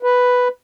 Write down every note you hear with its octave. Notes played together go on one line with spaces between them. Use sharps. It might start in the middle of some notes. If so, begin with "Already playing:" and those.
B4